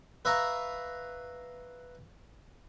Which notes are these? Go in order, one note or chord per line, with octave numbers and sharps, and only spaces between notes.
B4 E5 F5 A#5 C#6